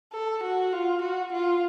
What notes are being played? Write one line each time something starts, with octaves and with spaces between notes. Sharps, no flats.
A4
F#4
F4
F#4
F4